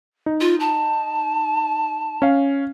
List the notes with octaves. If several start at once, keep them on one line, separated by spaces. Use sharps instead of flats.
D#4
F4
A5
C#4 F5